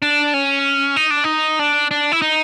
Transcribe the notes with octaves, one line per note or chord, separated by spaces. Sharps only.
D4
C#4
D#4
D4
D#4
D4
D4
E4
D#4